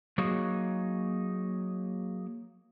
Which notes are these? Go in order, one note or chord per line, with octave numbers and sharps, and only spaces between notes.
F#3 A#3 D#4 F#4 G#4